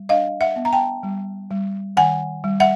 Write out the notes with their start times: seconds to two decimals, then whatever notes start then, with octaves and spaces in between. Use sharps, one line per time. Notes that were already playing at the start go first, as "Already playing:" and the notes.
Already playing: G3
0.09 D4 D#5 F5
0.41 E5 F#5
0.56 B3
0.65 A#5
0.72 G5 A5
1.03 G3
1.51 G3
1.97 D#3 F#5 G#5
2.44 G3
2.60 E5 F#5